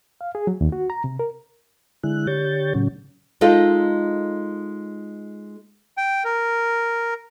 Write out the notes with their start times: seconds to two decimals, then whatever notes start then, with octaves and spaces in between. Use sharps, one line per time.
0.21 F5
0.35 G#4
0.47 F#3
0.61 D#2
0.72 F#4
0.90 A#5
1.04 C3
1.19 A#4
2.03 D3 G#3 E4 F#6
2.27 D3 G4 C#5 G6 A6
2.74 A2 C#3 F#3 C#4
3.41 G#3 D#4 F4 A4
5.97 G5
6.24 A#4